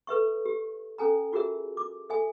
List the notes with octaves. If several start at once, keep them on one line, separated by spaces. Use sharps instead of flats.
A4 B4 E5 C#6
G4
C#4 A4 G#5 A#5
F4 F#4 G#4 A#4 E5
D6
A4 E5 G#5